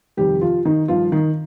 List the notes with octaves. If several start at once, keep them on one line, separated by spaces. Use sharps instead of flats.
F2 C3 D#3 G3 G4
F3 F4
D#3 D#4
G2 D#3 F3 F4
D#3 D#4